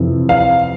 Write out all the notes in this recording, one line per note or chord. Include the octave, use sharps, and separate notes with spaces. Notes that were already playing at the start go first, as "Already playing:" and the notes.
Already playing: F2 C3 E3
F5